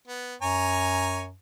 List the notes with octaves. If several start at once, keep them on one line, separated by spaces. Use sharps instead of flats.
B3
F#2 C#5 G#5 A#5